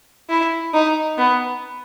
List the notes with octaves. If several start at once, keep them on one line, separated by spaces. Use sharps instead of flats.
E4
D#4
B3